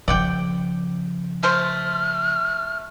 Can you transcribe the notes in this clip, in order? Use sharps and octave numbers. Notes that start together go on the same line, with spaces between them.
C#3 F3 D5 F#5 G5
A3 C5 F6